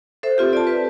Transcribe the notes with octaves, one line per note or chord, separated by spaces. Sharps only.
A4 C5 E5
C4 F4 G4
D5 A5
B4